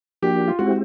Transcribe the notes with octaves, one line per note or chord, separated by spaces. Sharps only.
F3 A#3 D4 F#4 G4
F4
G#3 C4 E4 F#4 G4